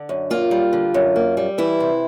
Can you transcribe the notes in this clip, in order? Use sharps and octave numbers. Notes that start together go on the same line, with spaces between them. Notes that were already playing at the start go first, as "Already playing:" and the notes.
Already playing: D3
F#2
A#3 F4
G3
D3
F#2
A#3
G3
E3 E4
C3